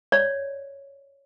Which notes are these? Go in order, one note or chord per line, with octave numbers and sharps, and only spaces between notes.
C#5 D5